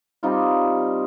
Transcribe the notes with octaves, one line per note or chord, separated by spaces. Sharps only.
G3 C4 D#4 F4